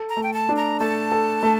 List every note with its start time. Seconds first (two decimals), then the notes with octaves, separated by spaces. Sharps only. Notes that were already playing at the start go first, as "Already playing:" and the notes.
Already playing: A4
0.09 A#5
0.17 A3
0.23 G5
0.33 A5
0.49 D4
0.56 A#5
0.80 A3 A5
1.12 A4
1.43 A3